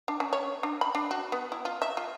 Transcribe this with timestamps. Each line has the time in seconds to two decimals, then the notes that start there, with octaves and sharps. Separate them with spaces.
0.08 D4
0.20 C#4
0.33 C#5
0.63 D4
0.81 B5
0.95 D4
1.11 F#4
1.32 B3
1.52 E4
1.65 F4
1.82 E5
1.97 F4